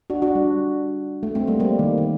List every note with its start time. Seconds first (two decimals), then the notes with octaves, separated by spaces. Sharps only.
0.10 D4 F#4
0.22 D4 F#4
0.35 G3
1.23 A3
1.35 A3 C4
1.47 G3 A#3
1.60 G3 A#3
1.79 D#3
1.98 D#3